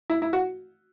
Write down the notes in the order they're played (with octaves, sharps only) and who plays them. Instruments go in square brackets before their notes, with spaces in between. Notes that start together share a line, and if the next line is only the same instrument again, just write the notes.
[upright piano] E4
E4
F#4